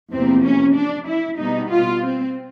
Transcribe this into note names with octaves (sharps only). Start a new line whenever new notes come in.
E2 C3 F3 A#3 C4
C#4
D4
E4
B2 G3 B3 D#4
F4
C4